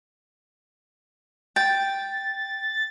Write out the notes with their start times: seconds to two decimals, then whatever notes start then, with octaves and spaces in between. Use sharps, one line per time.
1.56 G5 A6